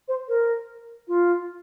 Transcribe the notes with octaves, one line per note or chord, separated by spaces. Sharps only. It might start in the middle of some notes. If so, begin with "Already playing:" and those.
C5
A#4
F4